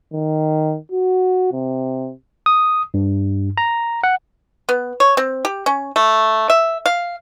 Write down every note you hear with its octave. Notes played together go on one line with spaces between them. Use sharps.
D#3
F#4
C3
D#6
G2
A#5
F#5
B3
C#5
C4
G4
C#4
A3
E5
F5